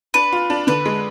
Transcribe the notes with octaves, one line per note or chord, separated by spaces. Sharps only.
D4 B4
F4
D4
D3 B4
G#3